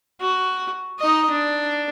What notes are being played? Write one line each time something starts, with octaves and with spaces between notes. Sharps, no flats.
F#4
D#4 D#5
D4